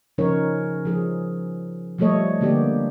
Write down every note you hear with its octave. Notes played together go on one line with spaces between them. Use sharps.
C#3 F3 C#4 D#4 A#4 C#5
F3 G#4
F3 G3 A3 A4 C#5 D#5
D3 A#3 B3 G4 D5